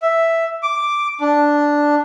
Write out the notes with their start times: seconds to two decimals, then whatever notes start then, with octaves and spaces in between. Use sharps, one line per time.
0.02 E5
0.63 D6
1.21 D4